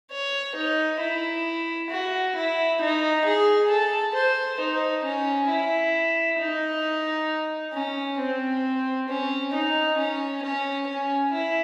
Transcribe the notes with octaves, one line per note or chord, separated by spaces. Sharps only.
C#5
D#4
E4
F#4
E4
D#4
G#4
A4
C5
D#4
C#4
E4
D#4
C#4
C4
C#4
D#4
C#4
C#4
C#4
E4